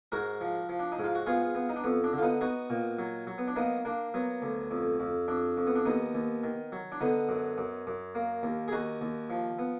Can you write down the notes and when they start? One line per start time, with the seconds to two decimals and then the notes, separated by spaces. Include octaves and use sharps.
0.12 G#2 F#4 A#4
0.41 F3
0.69 F3
0.80 D4
0.92 D#4
0.99 G#2
1.04 F4
1.15 F#4
1.27 B3 F4 G#4
1.55 B3
1.69 D#4
1.76 D4
1.84 F2 B3
2.04 D4
2.13 D3
2.18 F4
2.22 B3 D#4
2.41 B3 D#4 F#4
2.70 A#2
2.99 F#3
3.27 F#3
3.38 B3
3.48 D4
3.56 A#3 B3 D#4
3.85 A#3 D4
4.14 F#3 B3
4.42 D2
4.71 F2
5.00 F2
5.28 F2 D4
5.57 F2
5.67 B3
5.76 D4
5.86 D#2 B3 D#4
6.15 D#2
6.44 D#3
6.72 F#3
6.92 D4
7.01 D3 B3 D#4
7.29 F#2
7.58 F#2
7.87 F#2
8.15 A#3
8.43 D#2
8.68 G#4
8.72 D#2 D#4 F#4
9.01 D#2
9.30 F3
9.59 B3